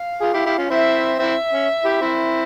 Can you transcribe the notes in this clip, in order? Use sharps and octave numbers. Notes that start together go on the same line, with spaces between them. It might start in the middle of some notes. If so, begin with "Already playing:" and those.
Already playing: F5
F4 G#4
E4 G4
E4 G4
C#4 F4
C4 E4 E5
C4 E4 E5
C#4
E4 G4
C4 E4